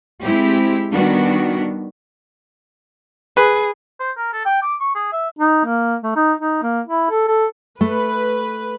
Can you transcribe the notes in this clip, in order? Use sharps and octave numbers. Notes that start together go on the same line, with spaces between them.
G#3 C4 E4 G4
D#3 G3 B3 D4 F#4
G#4 B4
C5
A#4
A4
G5
D6
C#6
G#4
E5
D#4
A#3
A3
D#4
D#4
A#3
E4
A4
A4
A3 B4